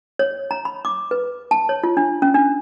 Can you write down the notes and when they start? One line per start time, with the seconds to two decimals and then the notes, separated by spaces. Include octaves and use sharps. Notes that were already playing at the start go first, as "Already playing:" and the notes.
0.19 C#5
0.51 A#5
0.65 B5
0.85 D6
1.11 B4
1.51 A5
1.69 C#5
1.84 F4
1.97 D4
2.22 C#4
2.34 D4